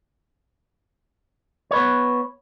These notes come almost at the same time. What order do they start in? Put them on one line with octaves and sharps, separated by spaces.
C#5 B4 B3